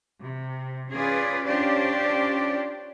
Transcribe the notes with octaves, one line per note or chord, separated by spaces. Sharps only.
C3
C#4 F4 G#4 B4 D5
C#4 D4 F4 G4 C5 D5